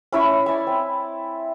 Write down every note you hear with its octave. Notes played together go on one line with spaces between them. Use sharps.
C#4 E4 B5 C#6
D5 E5 G#5
C4